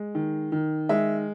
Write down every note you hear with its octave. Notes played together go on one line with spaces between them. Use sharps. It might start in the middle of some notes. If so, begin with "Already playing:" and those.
Already playing: G#3
D#3
D#3
G#3 E5